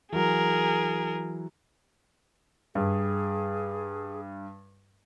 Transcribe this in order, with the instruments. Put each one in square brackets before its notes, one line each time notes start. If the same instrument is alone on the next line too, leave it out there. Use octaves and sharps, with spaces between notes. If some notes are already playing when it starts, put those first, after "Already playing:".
[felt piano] E3 F#3 [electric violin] G#4 A#4
[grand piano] G2 [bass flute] G#4